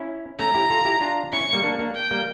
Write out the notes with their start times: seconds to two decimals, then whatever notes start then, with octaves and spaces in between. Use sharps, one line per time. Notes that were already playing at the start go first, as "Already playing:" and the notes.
Already playing: C#4 E4
0.39 A3 C#4 A#5
0.54 E4 G4
0.70 F4 A4
0.85 E4 G4
1.01 D4 F4
1.32 C#4 E4 C#6
1.53 G3 A#3
1.64 A#3 D4
1.79 A#3 D4
1.95 G5
2.11 G3 A#3